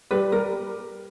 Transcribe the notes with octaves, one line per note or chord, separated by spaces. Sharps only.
G3 B4
G3 A#4